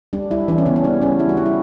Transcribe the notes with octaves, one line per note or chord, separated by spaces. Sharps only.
G3 D4
G3 E4
E3 D4
C#4
C#3 B3
C#4
G3 D4
G3 C#4
G3 E4
F#4
G3 D4
E4